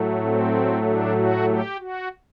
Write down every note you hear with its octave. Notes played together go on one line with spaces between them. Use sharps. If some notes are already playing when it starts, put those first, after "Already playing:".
Already playing: A2 F#3 A3
C4
D4
F#4
G4
F#4